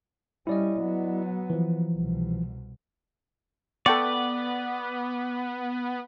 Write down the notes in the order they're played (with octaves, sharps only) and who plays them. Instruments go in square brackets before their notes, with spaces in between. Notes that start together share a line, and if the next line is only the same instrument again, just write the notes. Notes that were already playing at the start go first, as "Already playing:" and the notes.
[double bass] G3 C#4 [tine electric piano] E4 D5 D#5
[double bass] F#3 B3
[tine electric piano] E3 F3
[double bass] C2 B2
[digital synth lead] B3 [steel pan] A4 G5 C#6 [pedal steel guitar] D5